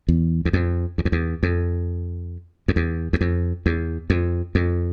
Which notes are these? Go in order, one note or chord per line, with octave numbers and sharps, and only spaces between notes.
E2
E2
F2
E2
F2
E2
F2
F2
E2
E2
F2
E2
F2
F2